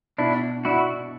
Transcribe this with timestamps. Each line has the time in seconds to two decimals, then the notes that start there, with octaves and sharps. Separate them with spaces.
0.18 B2 D4 E4
0.65 D4 E4 F#4